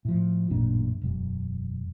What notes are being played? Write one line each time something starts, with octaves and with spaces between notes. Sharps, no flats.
A2 F3
A1 F#2 A#2 D4
E1 F#2